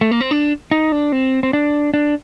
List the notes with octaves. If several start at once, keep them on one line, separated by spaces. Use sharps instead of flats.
A3
A#3
C4
D4
D#4
D4
C4
C4
D4
D4